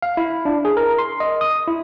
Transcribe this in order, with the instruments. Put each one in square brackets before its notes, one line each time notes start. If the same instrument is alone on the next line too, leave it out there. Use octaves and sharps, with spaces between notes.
[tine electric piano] F5
E4
D4
G#4
A#4
C6
D#5
D#6
E4